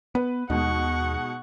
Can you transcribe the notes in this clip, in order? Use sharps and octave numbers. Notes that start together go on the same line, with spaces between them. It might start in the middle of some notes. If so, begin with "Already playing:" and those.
B3 B4
D#2 B2 G#3 D#4 F#5 C#6